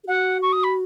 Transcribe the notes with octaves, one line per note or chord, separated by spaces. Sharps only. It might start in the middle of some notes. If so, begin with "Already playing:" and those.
G#4
F#4 F#5
C#6
D#6
B5